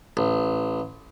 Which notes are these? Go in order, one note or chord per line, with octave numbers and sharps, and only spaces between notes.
A1